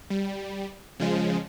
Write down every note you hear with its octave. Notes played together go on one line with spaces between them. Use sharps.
G3
C#3 F3 G#3